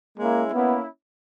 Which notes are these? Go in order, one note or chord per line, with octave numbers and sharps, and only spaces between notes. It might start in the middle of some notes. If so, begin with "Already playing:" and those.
G#3 A#3 C#4 E4
A#3 B3 C#4 E4